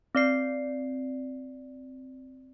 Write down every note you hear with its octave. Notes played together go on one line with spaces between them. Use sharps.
C4 D5 C7